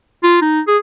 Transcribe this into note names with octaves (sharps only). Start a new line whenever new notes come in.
F4
D#4
G#4